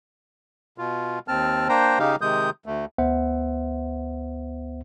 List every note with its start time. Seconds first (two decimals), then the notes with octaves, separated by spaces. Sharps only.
0.78 B2 F4
1.28 D#2 C4 A5 F6
1.69 A#3 D4 C5 G5 A#5
1.99 C#3 D#4 G4 F5
2.21 C3 D#3 G#3 D#6 G6
2.66 D2 A3
2.98 D2 B3 C5 E5 F#5